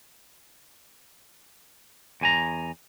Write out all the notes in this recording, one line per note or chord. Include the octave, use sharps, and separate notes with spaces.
E2 G#5 A#5